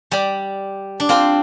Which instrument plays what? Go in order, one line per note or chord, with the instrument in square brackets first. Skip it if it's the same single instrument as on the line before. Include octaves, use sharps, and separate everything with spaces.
[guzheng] G3 [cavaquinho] D5 G5 D6
[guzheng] D4
[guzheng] C4 [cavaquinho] F4 C5 G5 C6